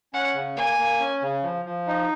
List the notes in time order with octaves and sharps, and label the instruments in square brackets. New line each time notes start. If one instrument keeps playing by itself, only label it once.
[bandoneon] C#4 [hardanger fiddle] F#5
[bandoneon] C#3
[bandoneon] A#3 [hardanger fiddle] G#5
[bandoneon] A#3
C#4
C#3
F3
F3
D#4